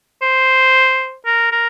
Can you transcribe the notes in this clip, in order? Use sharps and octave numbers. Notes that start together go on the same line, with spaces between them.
C5
A#4
A#4